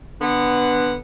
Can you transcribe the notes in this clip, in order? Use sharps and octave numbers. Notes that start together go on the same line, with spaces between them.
D3 B3